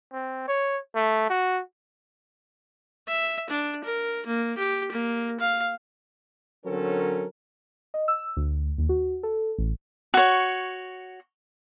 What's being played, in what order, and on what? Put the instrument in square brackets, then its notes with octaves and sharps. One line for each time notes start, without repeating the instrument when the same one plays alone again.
[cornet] C4
C#5
A3
F#4
[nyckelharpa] E5
D4
A#4
A#3
G4
A#3
F5
[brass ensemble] D3 F#3 C4 C#4 A4 A#4
[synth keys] D#5
E6
D2
D#2
F#4
A4
A1
[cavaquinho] F#4 C#5